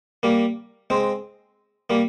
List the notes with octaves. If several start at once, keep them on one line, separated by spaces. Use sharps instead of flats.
G3 A#3
G#3 C4
G3 A#3